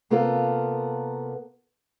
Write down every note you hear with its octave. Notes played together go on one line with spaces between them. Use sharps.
C3 A#3 B3 F4 A4 A#4